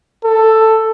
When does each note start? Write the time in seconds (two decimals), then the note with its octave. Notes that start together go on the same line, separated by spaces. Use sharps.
0.24 A4